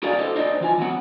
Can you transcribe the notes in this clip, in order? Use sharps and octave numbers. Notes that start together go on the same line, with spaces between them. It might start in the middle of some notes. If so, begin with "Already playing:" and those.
E4 F#4 G#4 A#4 D5 F5
F4 G4 A4 C5 D#5
D#4 E4 C5 D5 D#5
E3 F4 G#5
E3 F#3 A#3 B3 F#5